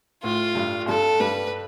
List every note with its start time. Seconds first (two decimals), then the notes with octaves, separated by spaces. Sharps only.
0.23 A2 A3 F4
0.55 G2 G3
0.88 G2 G3 A4
1.20 G2 G3 B4